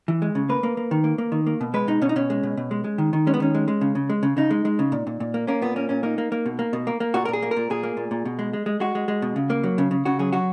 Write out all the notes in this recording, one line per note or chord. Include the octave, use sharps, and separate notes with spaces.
E3
G#3
C#3
A#3 B4
A#3
A#3
D#3
A#3
A#3
D#3
A#3
B2
G#3 B4
B2 D#4
B2 C#4
D#4
B2 C#4
G#3
B2
B2
G#3
G#3
D#3
D#3
G#3 C#4
B3
D#3 C#4
G#3
G#3
C#3
C#3
G#3
C#3
C#3 D#4
G#3
G#3
C#3
A#2
A#2
A#2
A#3
A#3 C#4
A#2 B3
A#3 C#4
A#2 C#4
A#3 D#4
A#3
A#3
B2
A#3
B2
A#3
A#3
A#2 F#4
A#4
A#2 G#4
A#3
A#4
A#2
A#2 G#4
A#3
A#2
A#2
B2
G#3
G#3
G#3
G#3 F#4
G#3
G#3
B2
C#3
A#3
F#3
C#3
C#3
C#3 F#4
F#3 G#4
F#3 F#4